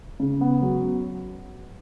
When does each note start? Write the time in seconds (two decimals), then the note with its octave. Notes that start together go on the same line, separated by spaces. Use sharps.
0.20 C#3
0.41 B3
0.62 F#3